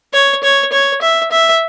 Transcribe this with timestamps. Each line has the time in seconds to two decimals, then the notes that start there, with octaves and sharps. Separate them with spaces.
0.13 C#5
0.43 C#5
0.72 C#5
1.02 E5
1.31 E5